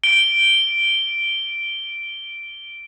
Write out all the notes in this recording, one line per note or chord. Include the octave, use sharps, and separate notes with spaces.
D7 G7